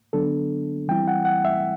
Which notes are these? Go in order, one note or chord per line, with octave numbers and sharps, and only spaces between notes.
D3 F#3 B3 D4 A4
E3 G3 C4 E4 G5
F#5
F#5
E5